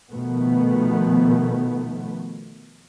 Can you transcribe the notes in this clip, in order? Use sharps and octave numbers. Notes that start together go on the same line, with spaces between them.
B2 D#3 F3 A3 B3